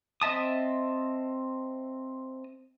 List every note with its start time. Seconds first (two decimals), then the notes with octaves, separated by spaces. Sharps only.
0.22 C4 D#5 E5 A5 D#6